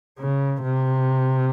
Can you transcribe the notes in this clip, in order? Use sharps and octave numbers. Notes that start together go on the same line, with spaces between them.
C#3
C3